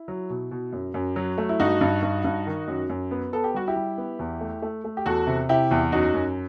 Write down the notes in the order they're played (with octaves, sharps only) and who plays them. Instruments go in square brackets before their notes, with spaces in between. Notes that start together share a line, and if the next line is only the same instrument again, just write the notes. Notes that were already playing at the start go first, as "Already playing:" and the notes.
Already playing: [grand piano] E4
F#3
B2
B2
F#2
F#2
F#3
A3
E4
G2 D#4 F#4
G2
G2
G2
D#3
F#2
F#2
B3
B3 A4
G4
G3 F#4
E4 G4
G3
B3
E2
A3
A3
A3
G4
E2 F#4 A4
C3
C3 E4 G4
E2
F#2 D#4 F#4
F#2